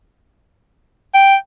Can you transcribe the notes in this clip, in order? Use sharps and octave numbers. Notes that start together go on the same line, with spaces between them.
G5